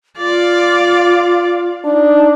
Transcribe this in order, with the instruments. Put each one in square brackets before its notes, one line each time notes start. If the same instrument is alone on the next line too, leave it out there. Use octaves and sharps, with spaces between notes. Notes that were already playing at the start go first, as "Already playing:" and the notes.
[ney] F4 [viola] D5 F5
[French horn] D4 [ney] D#4